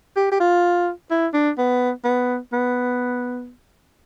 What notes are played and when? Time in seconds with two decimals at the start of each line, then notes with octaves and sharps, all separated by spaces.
0.16 G4
0.32 G4
0.40 F4
1.10 E4
1.34 D4
1.58 B3
2.04 B3
2.53 B3